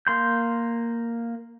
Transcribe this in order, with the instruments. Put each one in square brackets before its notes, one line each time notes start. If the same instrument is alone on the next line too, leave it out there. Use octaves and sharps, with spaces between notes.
[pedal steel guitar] A#3 C6 G6